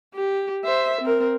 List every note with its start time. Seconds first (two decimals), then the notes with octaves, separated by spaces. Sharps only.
0.15 G4
0.65 C5 E5
1.01 C4 A#4